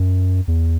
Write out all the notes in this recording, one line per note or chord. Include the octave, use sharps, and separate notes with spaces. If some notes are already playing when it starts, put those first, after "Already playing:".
Already playing: F#2
E2